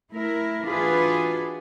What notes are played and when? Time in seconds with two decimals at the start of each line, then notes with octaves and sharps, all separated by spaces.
0.11 A3 E4 A#4
0.66 E3 D4 F4 F#4 G#4 B4